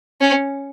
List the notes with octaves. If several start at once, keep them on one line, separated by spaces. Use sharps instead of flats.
C#4